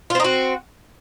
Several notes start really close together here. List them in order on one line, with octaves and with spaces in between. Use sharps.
F4 C4 D#4 F#4